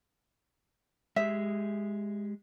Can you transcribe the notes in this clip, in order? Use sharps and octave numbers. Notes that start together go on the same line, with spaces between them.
G#3 G4 G#4 E5